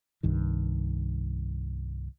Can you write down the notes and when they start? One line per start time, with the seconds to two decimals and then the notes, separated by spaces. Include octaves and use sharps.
0.23 C2 G2 D#3